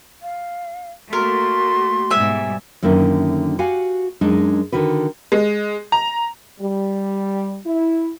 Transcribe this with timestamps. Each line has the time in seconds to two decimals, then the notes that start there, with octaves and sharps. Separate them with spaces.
0.22 F5
1.13 A3 A#3 F#4 A#4 C6
2.10 G#2 B2 G3 E5 G#5
2.83 F#2 D3 D#3 A3 A#3 E4
3.59 F#4 G4 F5 F#5 G#5
4.21 F#2 G#3 D4 D#4
4.72 D3 D#3 F#4 B4
5.32 G#3
5.92 A#5
6.60 G3
7.65 E4